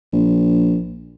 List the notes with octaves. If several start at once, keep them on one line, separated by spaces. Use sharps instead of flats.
A#1